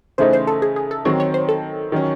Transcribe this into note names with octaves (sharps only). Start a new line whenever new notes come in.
C#3 E3 A3 D#4 C5
C5
A4
G#4
G#4
A4
D#3 F#3 C4 C#5
C#5
C5
A4
D#3 F#3 C#4